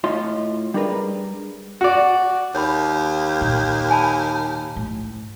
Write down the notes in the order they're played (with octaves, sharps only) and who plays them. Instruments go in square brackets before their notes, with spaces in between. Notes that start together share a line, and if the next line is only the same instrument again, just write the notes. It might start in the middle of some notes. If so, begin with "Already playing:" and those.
[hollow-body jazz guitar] A2 F4 C#5 D#5 C6
G3 D4 G#4 A#4 B4
[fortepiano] F#4 D5
[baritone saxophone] D#2 [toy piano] C#5 B5
[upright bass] A#2
[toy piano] G#5 A5 B5
[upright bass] A2